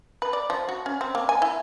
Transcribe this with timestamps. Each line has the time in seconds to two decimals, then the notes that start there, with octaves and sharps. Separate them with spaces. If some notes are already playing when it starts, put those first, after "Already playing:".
0.22 B4
0.33 D5
0.50 F3
0.69 F#4
0.86 C#4
1.01 C4
1.15 A#3
1.29 G#5
1.42 E4